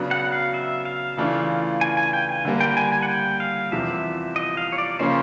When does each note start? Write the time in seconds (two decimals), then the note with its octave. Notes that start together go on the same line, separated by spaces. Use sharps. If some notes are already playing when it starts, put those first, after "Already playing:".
Already playing: C#3 F#3 B3 D4
0.11 F#5
0.32 F5
0.54 E5
0.85 F5
1.17 C#3 E3 A3 D4 F4
1.81 G#5
1.97 G#5
2.13 G5
2.29 G#5
2.45 D3 G3 A#3
2.61 G5
2.77 G#5
2.92 G#5
3.03 F#5
3.08 G5
3.40 F5
3.72 E2 C3 F3 E5
4.36 D#5
4.57 F5
4.73 C#5
4.78 D5
4.99 C#3 F3 A#3 C#4 C5